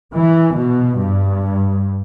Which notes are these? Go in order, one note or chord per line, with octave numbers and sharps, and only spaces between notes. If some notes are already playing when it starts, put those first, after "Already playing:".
E3
B2
G2